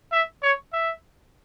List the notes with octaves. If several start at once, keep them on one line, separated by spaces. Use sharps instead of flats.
E5
C#5
E5